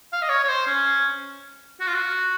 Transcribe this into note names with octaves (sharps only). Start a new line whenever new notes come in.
F5
D#5
C#5
C#5
C5
C#4
F#4
F4
F#4